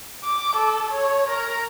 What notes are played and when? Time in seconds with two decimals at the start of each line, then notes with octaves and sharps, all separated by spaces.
0.24 D6
0.56 A4
0.91 C#5
1.30 A#4